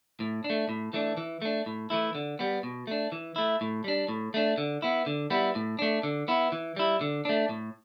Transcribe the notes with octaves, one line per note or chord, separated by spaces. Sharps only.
A2
D4
A3
A2
E3 A3 D4
E3
A3 D4
A2
E3 A3 E4
D3
G3 B3
B2
A3 D4
E3
A3 E4
A2
G3 D4
A2
A3 D4
D3
B3 E4
D3
G3 B3 E4
A2
A3 D4
D3
B3 E4
E3
G3 E4
D3
A3 D4
A2